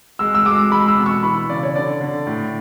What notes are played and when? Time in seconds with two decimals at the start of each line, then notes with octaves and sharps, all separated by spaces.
0.19 G#3 E6
0.35 E6
0.45 G#3 D6
0.71 G#3 B5
0.88 E6
0.97 B2
1.06 C#6
1.23 E3 B5
1.50 C#3 D5
1.63 C#5
1.76 D3 D5
2.01 D3
2.27 A2